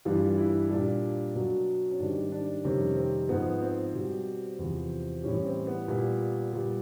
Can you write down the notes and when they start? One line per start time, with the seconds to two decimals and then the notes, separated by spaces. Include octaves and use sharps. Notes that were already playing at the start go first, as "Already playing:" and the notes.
0.05 G2 E3 G3 F4
0.38 E4
0.70 A#2 G3 D4
1.35 B2 F#3
1.90 C#4
2.00 G#2 D#3 G3 D4
2.32 D4
2.65 F2 C3 D#3 G3 C#4
2.97 C4
3.29 G#2 F3 B3
3.62 C4
3.94 B2 G3
4.59 E2 C3 F3
5.24 A2 E3 G3 C#4
5.46 C4
5.67 B3
5.88 A#2 G3
6.53 A#2 G3